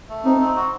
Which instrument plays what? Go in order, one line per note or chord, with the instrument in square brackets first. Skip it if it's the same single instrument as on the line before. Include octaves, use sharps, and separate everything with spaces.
[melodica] A3
[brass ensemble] C4 [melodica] D#4
[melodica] C4
F#4